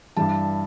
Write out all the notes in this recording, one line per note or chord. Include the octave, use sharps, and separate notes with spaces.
G2 E3 G3 A5